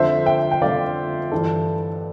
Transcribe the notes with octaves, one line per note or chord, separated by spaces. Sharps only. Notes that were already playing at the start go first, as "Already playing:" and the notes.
Already playing: F2 D3 C5 E5
E5 G5
G5
F2 D3 D5 F5
G2 E3 A4